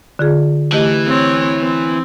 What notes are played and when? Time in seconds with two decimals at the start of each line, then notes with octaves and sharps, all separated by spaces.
0.19 D3 F4 G#4
0.72 E3 A3 G4 D#5
1.07 C4 C#5
1.60 C4